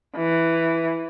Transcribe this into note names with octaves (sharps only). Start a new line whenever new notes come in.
E3